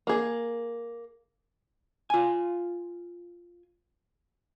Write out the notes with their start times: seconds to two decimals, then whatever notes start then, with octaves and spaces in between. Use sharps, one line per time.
0.07 A#3 G#4
2.10 F4 G#5